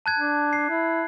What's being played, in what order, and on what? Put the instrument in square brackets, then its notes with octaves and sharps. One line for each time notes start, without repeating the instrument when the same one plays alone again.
[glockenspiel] A5 F#6 G#6
[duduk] D4
[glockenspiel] C7
[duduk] E4